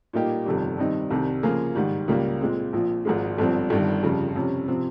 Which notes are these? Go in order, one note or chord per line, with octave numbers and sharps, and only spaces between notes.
A#2 G3 A#3 D#4 G4
G1 F2 C3 D#3 G3
G2 D#3 G3 C4 D#4
C2 C3 D#3 G3
C#3 F3 A#3 F4 G#4
G#2 D#3 G3
C#2 C#3 G3 A#3
A#2 G#3 C4
A#1 A#2 F3
G#1 G#2 F3 G#3
G1 G2 F3 C4
G1 G2 D#3
G1 F2 C#3 G3
F2 C3 G3 C#4
C3 F3 C4